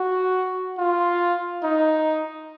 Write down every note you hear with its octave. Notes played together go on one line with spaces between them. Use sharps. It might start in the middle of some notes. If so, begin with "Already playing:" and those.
Already playing: F#4
F4
D#4